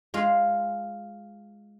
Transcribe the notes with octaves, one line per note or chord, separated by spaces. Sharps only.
G#3 F4 C6